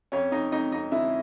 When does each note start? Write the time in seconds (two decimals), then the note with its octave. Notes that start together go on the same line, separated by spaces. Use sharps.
0.12 F2 C#4 C#5
0.32 F2 D#4 D#5
0.52 F2 D#4 D#5
0.72 F2 D#4 D#5
0.92 D3 E4 E5